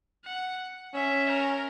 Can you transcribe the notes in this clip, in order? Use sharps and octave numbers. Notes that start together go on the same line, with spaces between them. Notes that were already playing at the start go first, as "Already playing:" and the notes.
F#5
C#4 E5
A#4